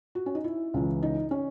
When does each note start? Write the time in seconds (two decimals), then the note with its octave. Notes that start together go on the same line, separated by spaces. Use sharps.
0.15 F#4
0.26 C#4
0.35 D#4
0.44 E4
0.74 C#2 C#3 E3
1.03 D#4
1.31 C#4